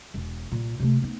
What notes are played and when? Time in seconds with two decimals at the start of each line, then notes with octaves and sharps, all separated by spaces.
0.14 E1
0.52 C2 A#2
0.80 C3 A3
1.02 B3 D#4